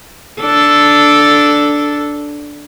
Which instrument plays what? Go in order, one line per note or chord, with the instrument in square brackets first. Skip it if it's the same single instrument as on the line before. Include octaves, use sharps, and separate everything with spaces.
[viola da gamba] D4 A4